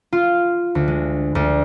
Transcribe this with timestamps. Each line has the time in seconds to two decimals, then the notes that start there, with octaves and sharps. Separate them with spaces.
0.13 F4
0.75 D2
0.88 G#3
1.35 D2